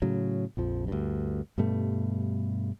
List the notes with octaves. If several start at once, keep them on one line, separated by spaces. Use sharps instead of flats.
A2 C#3 F#3
A#1 F2 F3
D2 G2
G2 B2 G3 A3